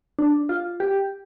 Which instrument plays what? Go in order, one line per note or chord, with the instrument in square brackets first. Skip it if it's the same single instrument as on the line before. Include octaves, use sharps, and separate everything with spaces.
[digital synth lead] D4
F4
G4